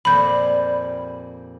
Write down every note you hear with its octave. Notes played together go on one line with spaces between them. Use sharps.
F2 A#2 G3 B5 G6